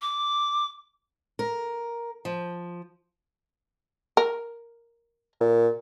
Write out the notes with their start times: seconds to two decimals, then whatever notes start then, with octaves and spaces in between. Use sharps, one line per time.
0.02 D6
1.39 A#4
2.25 F3
4.17 A#4
5.40 A#2